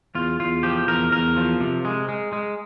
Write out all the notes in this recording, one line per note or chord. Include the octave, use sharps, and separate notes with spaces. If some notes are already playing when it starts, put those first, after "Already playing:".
E2 F4
E2 F4
F3 G4
E2 A#4
E2 A#4
F3
C3
G#3
G#3
G#3